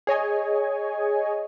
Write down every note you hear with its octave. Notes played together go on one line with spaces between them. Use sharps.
G#4 C#5 D#5 G#5